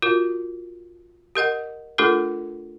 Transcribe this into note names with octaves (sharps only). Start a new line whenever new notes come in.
F4 F#4 A#4
G4 A#4 D#5 F#5
A3 D4 F4 G4 A4 A#4